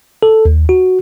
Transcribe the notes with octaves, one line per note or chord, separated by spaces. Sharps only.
A4
D#2
F#4